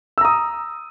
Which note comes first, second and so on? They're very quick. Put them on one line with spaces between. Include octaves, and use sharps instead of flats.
E6 A#5 D#6